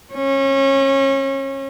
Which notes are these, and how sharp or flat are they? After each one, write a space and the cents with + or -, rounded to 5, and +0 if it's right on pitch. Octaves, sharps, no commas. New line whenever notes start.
C#4 -30